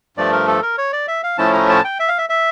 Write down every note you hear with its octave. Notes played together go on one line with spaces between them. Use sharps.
G2 F3 A3 D5
A#4
A4
A#4
C#5
D5
E5
F5
A2 F3 A3 C#4 E4 A5
A#5
A5
G5
E5
F5
E5
E5